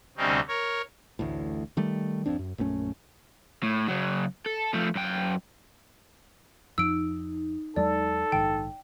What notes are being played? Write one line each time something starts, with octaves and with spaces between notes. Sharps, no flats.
D2 C3 G3 C4 C#4 D#4
A#4 C#5
A1 D2 A2
D#3 G3 A3
G1 F2 C4 D4
F#2
A#1 F#2 A3 C#4
A2
C#3 F#3
A4
F3 A3
F#2 G5
F2 F3 D#4 E6 D7
E2 F#3 G#3 A4 D5
A#1 G#2 D#3 G5